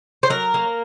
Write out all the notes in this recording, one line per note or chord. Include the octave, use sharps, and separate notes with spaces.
C5
F#3 A#4
A#3